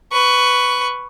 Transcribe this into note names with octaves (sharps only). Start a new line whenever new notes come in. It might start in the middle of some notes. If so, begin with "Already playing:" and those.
B4 C#6